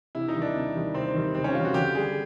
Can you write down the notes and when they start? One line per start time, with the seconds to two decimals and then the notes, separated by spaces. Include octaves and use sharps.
0.15 C3 E4
0.28 D#4
0.35 D#3 G3
0.42 D4
0.56 C3
0.75 D#3 G3
0.94 C3 C4
1.14 D#3 G3
1.35 C3 C4
1.44 C#4
1.54 D#3 G3 F4
1.65 F#4
1.74 D3 G4
1.95 G3 G#4